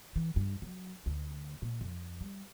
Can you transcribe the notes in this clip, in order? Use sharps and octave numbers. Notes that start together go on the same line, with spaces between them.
E3
G2
F#3
D2
A#2
F2
G3